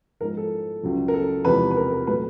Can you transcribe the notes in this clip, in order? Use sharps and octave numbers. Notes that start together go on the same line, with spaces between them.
G#2 F3 G#3 A#4
A4
C#2 C#3 F#3
A#4
A4
E2 C3 F3 G#3 C4 B4
B4
A#4
A#4
A#2 F#3 A3 C4 B4